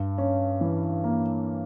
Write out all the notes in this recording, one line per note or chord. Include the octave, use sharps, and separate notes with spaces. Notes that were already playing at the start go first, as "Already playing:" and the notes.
Already playing: G2
C#4
E3
A#3